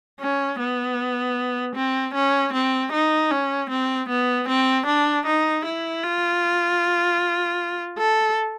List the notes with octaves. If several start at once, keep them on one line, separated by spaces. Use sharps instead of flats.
C#4
B3
C4
C#4
C4
D#4
C#4
C4
B3
C4
D4
D#4
E4
F4
A4